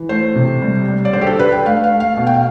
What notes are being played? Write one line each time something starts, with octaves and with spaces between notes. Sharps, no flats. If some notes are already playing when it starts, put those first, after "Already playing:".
Already playing: E3
A3 C5
C3
G3
G3
D5
D3 C5
G4
A4
D3 B4
G5
A3 F5
F5
A3
F5
B2
G5
F5